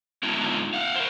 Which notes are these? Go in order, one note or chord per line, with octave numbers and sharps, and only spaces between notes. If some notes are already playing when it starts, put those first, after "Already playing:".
G#3 A3 B3 D4 D#4 F4
F5 F#5
A#4 C5